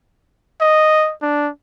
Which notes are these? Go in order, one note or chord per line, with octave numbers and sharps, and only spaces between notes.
D#5
D4